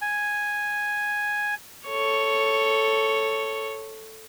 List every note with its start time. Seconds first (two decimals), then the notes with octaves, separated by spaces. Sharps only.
0.02 G#5
1.87 A4 C#5